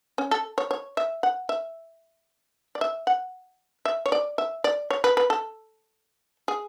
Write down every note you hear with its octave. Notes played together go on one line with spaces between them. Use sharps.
C#4
A4
C#5
C#5
E5
F#5
E5
D5
E5
F#5
E5
C#5
D5
E5
D5
C#5
B4
B4
A4
G#4